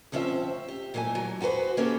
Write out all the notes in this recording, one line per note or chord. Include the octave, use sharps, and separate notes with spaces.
D2 F3 C4 C#4 A#4 E5
G4
A#2 E3 F#3 A3 G#5
D3 F#3
E2 F#4 G4 B4 C5
A#3 C#4 G4 A4